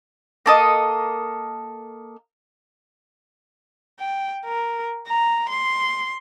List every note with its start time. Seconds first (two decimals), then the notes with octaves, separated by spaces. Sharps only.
0.46 A#3 A4 D#5
3.99 G5
4.45 A#4
5.07 A#5
5.49 C6